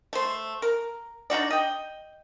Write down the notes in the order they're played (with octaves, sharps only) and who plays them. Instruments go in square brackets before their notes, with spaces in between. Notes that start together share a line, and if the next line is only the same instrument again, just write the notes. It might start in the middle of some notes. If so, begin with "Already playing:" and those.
[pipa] A3 C5
A#4
D4 D#4 F#4 D5
D#5 G5